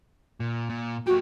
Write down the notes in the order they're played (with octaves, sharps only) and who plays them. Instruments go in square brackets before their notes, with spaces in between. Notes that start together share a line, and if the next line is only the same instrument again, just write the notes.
[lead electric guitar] A#2
A#2
[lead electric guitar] A3 G4 [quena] F#4